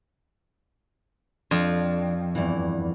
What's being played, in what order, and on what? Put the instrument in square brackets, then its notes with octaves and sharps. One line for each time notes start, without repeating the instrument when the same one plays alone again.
[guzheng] F2 [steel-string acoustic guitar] D4
[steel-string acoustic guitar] E2 G2 E3